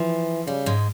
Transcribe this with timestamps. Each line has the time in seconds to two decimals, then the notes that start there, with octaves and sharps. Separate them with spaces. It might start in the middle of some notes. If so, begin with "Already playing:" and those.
Already playing: E3 F3
0.47 C#3 G3
0.66 G#2 G#3